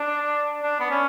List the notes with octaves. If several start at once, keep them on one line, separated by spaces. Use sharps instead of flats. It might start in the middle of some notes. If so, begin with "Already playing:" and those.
Already playing: D4
D4
B3
C#4